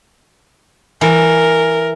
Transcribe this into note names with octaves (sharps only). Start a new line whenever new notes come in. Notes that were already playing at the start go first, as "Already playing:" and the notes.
E3 A#4